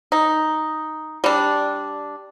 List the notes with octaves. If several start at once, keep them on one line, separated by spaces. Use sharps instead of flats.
D#4
G3 D4